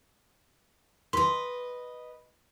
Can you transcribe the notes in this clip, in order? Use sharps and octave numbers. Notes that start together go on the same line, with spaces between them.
B4 D#5 C6